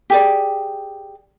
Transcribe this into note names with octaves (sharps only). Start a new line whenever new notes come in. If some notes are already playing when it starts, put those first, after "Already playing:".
G4 G#4 D5